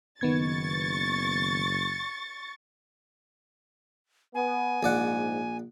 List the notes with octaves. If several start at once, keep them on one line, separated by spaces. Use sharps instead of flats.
F#1 D#3 B3 C#6 G#6 A6
B3 G#5
A#1 G#2 D5 F#5